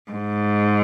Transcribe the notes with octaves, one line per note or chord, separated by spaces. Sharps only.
G#2